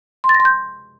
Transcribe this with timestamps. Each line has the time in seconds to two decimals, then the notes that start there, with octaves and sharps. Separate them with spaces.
0.24 C6
0.29 A6
0.35 A#6
0.40 C6
0.45 G6